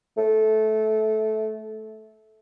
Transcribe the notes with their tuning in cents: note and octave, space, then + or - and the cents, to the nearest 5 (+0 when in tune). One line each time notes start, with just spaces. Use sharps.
A3 -15